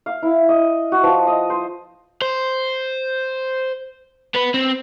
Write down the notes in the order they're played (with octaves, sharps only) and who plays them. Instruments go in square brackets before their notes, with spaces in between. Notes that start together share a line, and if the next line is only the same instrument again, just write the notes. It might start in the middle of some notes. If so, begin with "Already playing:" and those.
[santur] F5
E4
D#5
F#4
F3
D#5
C5
[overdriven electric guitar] C5
B3 B4
C4